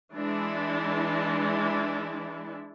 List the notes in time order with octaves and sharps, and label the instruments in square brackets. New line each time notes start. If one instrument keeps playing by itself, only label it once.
[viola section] E3 G#3 D4 E4